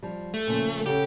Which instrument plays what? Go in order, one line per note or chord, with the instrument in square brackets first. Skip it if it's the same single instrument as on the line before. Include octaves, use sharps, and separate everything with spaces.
[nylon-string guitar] F3 G3
[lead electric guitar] A3
[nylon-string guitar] A#2 C#3 F3
[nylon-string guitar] C#3 A4 F#5 [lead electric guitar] G4